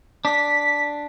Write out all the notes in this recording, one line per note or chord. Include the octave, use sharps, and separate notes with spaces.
D4 B6